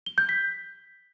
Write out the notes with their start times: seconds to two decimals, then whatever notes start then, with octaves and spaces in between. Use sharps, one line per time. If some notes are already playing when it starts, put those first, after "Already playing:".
0.06 G7
0.18 G6
0.29 B6